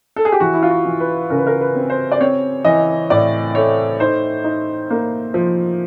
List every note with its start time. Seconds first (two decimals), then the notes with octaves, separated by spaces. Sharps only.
0.16 A4
0.25 G#4
0.32 G4
0.40 E3 F#4
0.54 E4
0.63 F4
0.70 F#4
0.85 E3
1.00 B4
1.30 C#3 A#4
1.39 B4
1.47 A#4
1.61 B4
1.76 C4
1.90 C5
2.12 D5
2.20 C4 C#5
2.65 E3 D#5
3.10 A2 D5
3.55 A3 C#5
4.00 D#4 C5
4.44 D#4
4.90 A#3
5.34 F3